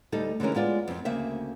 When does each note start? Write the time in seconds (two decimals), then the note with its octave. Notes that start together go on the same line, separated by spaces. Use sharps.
0.12 D2 G3 D#4 A4
0.40 D3 E3 G#3 C#4 A#4
0.55 G#3 B3 F4 D5
0.88 F2 C4
1.05 D2 C#3 A#3 C4 E5